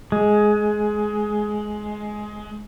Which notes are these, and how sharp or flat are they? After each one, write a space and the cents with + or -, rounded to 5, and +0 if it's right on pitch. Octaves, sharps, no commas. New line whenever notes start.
G#3 +15